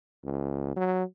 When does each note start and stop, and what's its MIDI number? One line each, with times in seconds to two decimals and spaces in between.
0.25 0.75 37
0.76 1.03 54